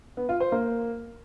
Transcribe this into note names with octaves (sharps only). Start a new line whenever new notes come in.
B3
F4
C5
A#3